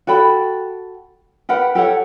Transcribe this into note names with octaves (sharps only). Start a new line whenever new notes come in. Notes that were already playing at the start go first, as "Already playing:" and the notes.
F#4 A4 G5 B5
G4 A#4 B4 F#5
G4 A4 C#5 F#5